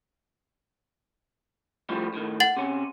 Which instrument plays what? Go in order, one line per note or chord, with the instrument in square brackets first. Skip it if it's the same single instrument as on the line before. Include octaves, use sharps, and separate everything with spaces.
[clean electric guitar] A2 F3 G3
A2 D#3
[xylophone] F#5 A6 F#7
[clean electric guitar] C3 C#4